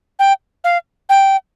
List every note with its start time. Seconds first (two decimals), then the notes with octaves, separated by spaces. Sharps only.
0.19 G5
0.64 F5
1.09 G5